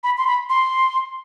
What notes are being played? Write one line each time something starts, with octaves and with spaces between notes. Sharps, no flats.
B5
C6
B5
C6